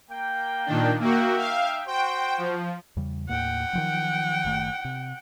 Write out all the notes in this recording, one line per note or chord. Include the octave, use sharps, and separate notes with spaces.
A#3 G5
A#2 D#3 D4
A#3 D#4 F#4 E5 G5
F5
F#4 C5 G5
F3
E2 C#3 G3
D#2 A2 A#3 F#5 G5
D#3 F3 F#3
F#1 D#3 A3
C3